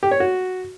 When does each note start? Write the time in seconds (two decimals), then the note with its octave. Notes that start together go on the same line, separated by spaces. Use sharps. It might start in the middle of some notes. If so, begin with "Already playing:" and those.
0.03 G4
0.11 C#5
0.20 F#4